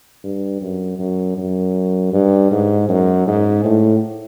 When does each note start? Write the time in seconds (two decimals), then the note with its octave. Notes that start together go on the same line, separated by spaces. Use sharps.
0.24 G2
0.62 F#2
0.99 F#2
1.38 F#2
2.13 G2
2.51 G#2
2.89 F#2
3.27 G#2
3.64 A2